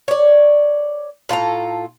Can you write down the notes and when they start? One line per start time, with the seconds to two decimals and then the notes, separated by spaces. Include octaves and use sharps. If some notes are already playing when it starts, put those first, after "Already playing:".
0.08 C#5 D5
1.29 A2 F4 A4 A#5